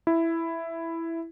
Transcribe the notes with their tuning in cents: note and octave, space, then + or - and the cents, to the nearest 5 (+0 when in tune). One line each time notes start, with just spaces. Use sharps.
E4 +5